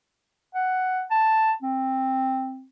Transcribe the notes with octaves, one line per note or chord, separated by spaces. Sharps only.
F#5
A5
C4